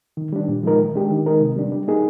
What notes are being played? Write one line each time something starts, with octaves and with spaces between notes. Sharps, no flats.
D#3
G3 D4
A#2
F3 G#3 D#4 A#4
D#3
G#3 D4 G4
D#3
G#3 D#4 A#4
C3
G3 D4
G3
A#3 D#4 G#4